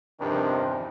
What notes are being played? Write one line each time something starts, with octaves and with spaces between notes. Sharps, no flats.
E2 G2 C3 D#3 F3 D4